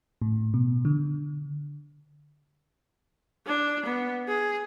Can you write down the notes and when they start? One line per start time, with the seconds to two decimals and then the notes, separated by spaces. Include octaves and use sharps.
0.22 A2
0.54 B2
0.85 D3
3.46 D4
3.86 B3
4.28 G#4